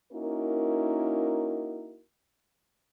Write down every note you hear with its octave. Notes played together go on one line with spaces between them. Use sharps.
A#3 C#4 D#4 E4 F#4 A#4